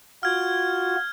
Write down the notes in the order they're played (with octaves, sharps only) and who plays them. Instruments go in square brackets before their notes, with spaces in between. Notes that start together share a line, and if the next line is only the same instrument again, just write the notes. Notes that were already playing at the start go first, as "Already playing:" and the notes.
[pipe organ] F4 F#4 [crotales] F6 G#6